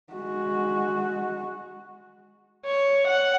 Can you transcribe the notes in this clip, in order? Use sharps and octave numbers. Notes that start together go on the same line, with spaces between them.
G#3 F#4
C#5
F#5